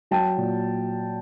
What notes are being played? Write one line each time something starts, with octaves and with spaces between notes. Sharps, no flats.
F#3 G5 A5
A#2